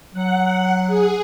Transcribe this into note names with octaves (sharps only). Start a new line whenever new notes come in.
F#3 F#5
G#4